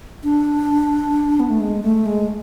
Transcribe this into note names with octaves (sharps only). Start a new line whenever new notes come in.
D4
B3
A3
G#3
A3
G#3